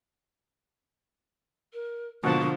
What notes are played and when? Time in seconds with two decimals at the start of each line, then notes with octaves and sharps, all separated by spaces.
1.73 A#4
2.24 G#2 B2 D3 F3 A#3 F#5 A5 C#6